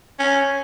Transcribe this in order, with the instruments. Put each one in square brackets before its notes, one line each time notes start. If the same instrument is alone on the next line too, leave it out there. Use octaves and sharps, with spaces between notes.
[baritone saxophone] C#4